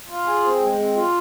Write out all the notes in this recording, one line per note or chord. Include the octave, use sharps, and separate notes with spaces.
F4
G#4
C4
G#3
C4
F4